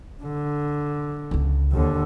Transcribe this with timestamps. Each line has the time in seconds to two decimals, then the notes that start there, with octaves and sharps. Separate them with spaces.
0.23 D3
1.31 C#2 D4
1.72 D#2 D3